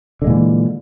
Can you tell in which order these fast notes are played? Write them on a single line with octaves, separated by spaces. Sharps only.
D3 G#3 A#2 E3